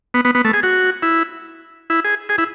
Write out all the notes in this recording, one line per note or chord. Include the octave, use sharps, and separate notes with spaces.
B3
B3
B3
A3
G#4
F#4
E4
E4
G#4
G#4
E4